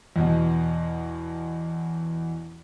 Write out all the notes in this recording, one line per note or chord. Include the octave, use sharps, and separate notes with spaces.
E2 B2